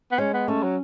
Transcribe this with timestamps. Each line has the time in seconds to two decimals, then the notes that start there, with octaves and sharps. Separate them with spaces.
0.11 B3
0.18 G#3 C#4
0.33 B3
0.48 A3 C#4
0.63 F#3